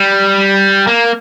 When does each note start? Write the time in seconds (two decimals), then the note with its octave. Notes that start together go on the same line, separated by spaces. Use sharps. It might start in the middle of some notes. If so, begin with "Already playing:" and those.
Already playing: G3
0.87 A#3